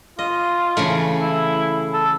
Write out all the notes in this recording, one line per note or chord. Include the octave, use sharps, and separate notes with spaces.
F4 D#5
C#3 E3 A3
E4
A4